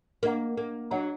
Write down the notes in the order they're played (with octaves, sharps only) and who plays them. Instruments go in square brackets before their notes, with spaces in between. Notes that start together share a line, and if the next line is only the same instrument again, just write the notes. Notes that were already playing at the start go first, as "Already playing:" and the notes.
[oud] A#3 [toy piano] D4 G#4 D#5 F#5 A#5
[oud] A#3
[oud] F#3 [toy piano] D4 G#4 D#5 F#5 A#5